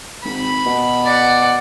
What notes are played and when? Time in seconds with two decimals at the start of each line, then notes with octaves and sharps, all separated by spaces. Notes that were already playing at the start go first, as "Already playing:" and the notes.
0.24 G#1 B5
0.66 B2
1.05 D5 F#5